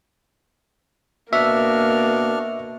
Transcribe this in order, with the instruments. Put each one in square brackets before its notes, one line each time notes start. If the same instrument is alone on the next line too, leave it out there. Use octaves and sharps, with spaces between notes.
[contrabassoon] B2 [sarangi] A#3 [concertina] D4 C#6 F6 [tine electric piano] E5